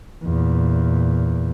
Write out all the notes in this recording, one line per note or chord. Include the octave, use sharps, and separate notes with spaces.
E2 A#2